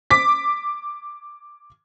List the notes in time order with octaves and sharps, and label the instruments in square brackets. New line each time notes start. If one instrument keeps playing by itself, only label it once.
[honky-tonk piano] D6 B6